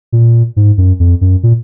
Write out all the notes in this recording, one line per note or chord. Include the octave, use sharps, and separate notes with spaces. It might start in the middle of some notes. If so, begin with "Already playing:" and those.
A#2
G#2
F#2
F2
F#2
A#2